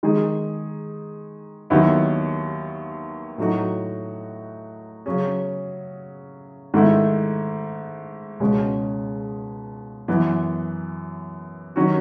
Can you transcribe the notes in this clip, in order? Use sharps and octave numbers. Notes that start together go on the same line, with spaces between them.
D#3 G#3 D#4 G#4
D#2 D#3 F#3 B3 E4
A2 F#3 A3 D#4 F#4
C#3 F#3 C#4 G#4
G#2 D#3 A3 E4
C#2 B2 G#3 C#4 G#4
F#2 E3 B3
D#3 F#3 C#4 F#4